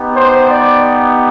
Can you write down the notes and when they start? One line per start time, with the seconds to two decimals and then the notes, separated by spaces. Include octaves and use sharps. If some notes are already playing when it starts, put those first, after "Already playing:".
Already playing: B3 D#4 G4
0.15 C5
0.49 D5